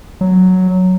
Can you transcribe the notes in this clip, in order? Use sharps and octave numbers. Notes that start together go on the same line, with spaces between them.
F#3